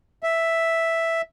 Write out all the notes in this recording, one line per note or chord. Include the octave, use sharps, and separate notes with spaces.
E5